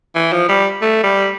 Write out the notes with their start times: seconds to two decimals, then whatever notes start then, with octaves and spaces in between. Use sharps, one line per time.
0.16 E3
0.33 F3
0.49 G3
0.82 A3
1.04 G3